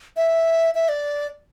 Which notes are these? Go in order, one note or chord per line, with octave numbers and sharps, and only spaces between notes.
E5
E5
D5